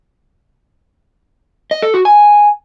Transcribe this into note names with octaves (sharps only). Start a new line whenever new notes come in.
D#5
A4
F#4
G#5